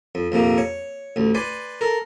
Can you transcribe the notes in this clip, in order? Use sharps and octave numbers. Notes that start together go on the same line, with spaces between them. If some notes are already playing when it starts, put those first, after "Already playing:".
F2
A#1 F2 C3 A#3
C#5
A1 D2
B4 D5 G#5 C6
A4 A#4